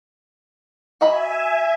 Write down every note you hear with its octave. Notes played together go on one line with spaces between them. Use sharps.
F#4 D#5 E5 G#5 B5